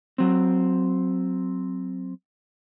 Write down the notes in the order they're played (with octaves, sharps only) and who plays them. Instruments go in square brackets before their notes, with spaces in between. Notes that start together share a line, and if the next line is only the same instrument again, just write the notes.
[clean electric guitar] F#3 C4